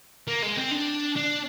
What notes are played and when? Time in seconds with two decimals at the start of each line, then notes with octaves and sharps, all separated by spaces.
0.28 A#3
0.43 G#3
0.57 C4
0.71 D4
1.16 D4